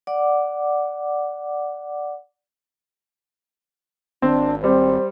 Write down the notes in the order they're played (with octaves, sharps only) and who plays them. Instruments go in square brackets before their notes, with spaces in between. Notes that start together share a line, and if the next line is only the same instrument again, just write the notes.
[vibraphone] D5 F#5 D6
[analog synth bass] G#1 [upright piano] C4 [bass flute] D4
[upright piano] G3 [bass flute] C4 [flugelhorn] C5